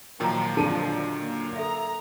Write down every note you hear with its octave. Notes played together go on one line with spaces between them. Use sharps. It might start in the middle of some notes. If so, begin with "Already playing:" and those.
A#2 D#3 F3 F#3 G5 A#5
D3 F3 A5 D#7
A#3
A4 E5 A#5